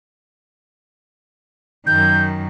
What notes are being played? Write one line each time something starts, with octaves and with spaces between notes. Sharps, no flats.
F#2 D#3 G6